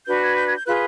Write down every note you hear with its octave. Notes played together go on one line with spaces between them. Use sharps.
D4 F#4 B4 G6
G#6
G6
G#6
G6
F4 G#4 B4 F#6